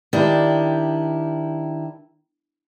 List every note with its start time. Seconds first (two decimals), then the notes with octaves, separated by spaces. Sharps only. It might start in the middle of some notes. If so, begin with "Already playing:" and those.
0.13 D#3 D4 E4 G4